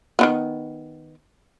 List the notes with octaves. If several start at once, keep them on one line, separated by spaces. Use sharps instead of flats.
D#3 E3 B3